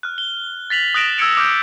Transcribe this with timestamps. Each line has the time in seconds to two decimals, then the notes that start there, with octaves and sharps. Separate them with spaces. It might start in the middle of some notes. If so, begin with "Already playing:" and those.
0.03 F6 F#6
0.18 G7
0.70 A6 B6 F7 F#7
0.94 D#6 F#6 A#6 D7 E7 F#7
1.18 E6 G#6 A6 C#7 D7 F7
1.37 D6 F6 G6